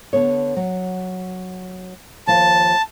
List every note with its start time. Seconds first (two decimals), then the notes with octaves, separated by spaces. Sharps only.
0.13 D3 B3 C#5
0.56 F#3
2.27 D#2 F3 F5 A5